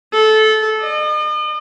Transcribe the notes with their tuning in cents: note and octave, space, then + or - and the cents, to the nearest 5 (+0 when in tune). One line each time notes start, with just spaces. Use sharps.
A4 -20
D#5 -45